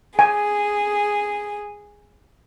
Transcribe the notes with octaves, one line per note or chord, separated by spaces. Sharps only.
G#4 G#5